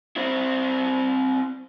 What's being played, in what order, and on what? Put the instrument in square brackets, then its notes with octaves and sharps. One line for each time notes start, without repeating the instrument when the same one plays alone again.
[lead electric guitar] C4 E4